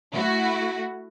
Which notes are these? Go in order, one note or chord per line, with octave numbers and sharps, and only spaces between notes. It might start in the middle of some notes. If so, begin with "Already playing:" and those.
A3 E4 F#4